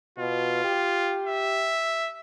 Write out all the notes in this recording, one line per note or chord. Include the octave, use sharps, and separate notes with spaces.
B2 F4
G4
E5